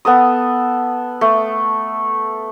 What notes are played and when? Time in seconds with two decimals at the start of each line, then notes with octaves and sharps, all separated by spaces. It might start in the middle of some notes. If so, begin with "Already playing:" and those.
0.05 B3 A4 D#6
1.21 A3